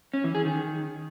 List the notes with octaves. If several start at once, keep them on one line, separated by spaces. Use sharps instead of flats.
C#4
E3
G#4
D#3